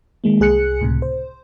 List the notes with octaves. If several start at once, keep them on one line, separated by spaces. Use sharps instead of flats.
D#3 G#3 A#3
C2 G#4 F#6 C#7
C#2 A2 C3
C5